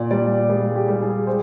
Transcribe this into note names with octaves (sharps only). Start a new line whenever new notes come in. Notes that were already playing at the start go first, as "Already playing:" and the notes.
Already playing: A#2 D5
G3 D5
G3 G#4
G4
G3
G#4
G#3 C5